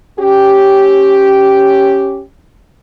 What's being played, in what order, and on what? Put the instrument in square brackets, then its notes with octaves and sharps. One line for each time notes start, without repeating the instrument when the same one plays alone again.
[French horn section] C#4 G4